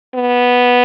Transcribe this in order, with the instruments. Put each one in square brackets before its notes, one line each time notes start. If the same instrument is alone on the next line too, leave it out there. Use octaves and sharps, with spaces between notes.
[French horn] B3